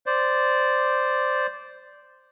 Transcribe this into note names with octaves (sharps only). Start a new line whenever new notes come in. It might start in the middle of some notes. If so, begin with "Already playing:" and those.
C5 D5